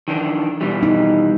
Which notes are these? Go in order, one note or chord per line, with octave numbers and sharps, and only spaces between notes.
D#3 E3 D4
B2 E3 G3
D#4